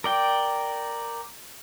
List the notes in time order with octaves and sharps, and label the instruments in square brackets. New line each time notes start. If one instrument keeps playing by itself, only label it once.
[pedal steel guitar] A#4 D5 G5